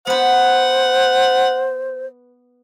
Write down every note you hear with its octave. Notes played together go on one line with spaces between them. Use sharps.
B3 B4 C5 F#5